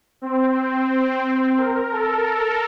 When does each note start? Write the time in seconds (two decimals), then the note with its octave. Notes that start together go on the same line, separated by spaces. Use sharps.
0.22 C4
1.58 A#4
1.92 A4